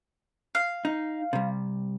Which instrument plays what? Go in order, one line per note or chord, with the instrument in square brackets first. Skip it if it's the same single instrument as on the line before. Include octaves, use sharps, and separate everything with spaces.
[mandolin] F5
[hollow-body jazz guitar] D#4
C3 G3